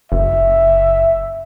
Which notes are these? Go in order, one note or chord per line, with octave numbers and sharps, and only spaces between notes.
F#1 E5